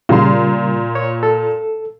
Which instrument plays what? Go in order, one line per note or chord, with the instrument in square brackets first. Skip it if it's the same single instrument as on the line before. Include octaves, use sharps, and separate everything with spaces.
[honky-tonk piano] A#2 C6 [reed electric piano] C#3 G3
[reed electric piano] C#5
A4